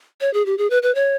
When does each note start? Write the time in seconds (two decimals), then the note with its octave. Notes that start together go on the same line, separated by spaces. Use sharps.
0.21 C#5
0.34 G#4
0.46 G4
0.58 G#4
0.70 B4
0.83 B4
0.95 C#5